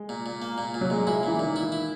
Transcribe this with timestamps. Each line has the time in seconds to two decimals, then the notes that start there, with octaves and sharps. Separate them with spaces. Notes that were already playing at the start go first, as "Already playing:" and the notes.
Already playing: G#3
0.09 A#2
0.26 A#2
0.42 A#3
0.58 A#2
0.74 A#2
0.81 F#3
0.90 A#2 G#3
1.07 G#3 E4
1.23 A#2 E3
1.39 A#2 D#3
1.56 E4
1.72 E4